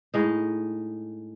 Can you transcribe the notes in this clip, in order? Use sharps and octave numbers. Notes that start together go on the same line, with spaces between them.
A2 G#3 D#4